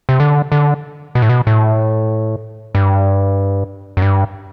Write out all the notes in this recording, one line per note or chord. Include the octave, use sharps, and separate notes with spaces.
C3
D3
D3
B2
A2
B2
A2
G2
F#2
G2